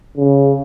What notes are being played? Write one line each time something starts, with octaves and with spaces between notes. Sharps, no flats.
C#3